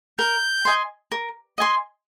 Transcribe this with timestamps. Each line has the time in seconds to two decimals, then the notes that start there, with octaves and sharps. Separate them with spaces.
0.18 A#4 G6
0.65 D#5 G#5 C6
1.12 A#4
1.58 D#5 G#5 C6